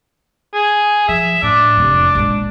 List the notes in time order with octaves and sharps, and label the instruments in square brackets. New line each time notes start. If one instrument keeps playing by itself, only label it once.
[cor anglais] G#4
[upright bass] F3 [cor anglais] E5
[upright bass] A2 [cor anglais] D4
[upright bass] F1 F2
A#1 G#3